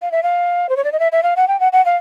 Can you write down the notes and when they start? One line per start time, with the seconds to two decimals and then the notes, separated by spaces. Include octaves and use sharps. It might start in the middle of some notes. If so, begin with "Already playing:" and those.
0.02 F5
0.12 E5
0.23 F5
0.69 C5
0.77 C#5
0.84 D5
0.92 D#5
0.99 E5
1.12 E5
1.23 F5
1.36 F#5
1.48 G5
1.60 F#5
1.72 F#5
1.85 F5